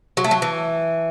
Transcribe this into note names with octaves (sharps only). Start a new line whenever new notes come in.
F#3
A3
F#3
E3